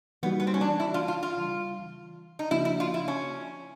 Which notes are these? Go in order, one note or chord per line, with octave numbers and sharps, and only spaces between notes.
E3 G3 A#3 B3 D#4 F#4
B3
C4
C#4
D4
E4
F4
F4
F4
C#3 E3 G3
D#4
C#3 F3 A#3 D4 E4 F#4
E4
F4
E4
C#4